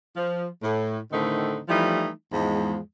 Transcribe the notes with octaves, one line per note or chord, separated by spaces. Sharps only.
F3
A2
A2 D3 D#3 A3 C4 D#4
E3 F3 G3 A3 D#4 E4
E2 G#2 F3 G#3